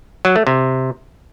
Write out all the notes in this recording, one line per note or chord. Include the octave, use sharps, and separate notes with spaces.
F#3
A3
C3